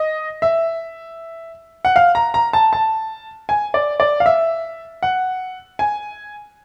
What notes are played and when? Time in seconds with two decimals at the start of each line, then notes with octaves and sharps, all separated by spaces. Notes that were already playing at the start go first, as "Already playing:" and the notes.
Already playing: D#5
0.42 E5
1.85 F#5
1.96 F5
2.15 A#5
2.34 A#5
2.53 A5
2.73 A5
3.49 G#5
3.74 D5
4.00 D5
4.20 F5
4.26 E5
5.03 F#5
5.79 G#5